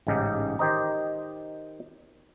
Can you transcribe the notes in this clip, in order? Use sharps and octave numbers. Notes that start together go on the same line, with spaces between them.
A1 G#2 C#3 D#4 G4
D#3 G4 C5 D#5 A#5